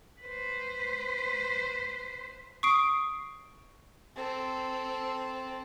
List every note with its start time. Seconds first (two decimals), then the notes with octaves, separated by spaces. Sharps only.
0.21 B4 C5
2.63 C#6 D#6 C7 D7
4.16 C4 A4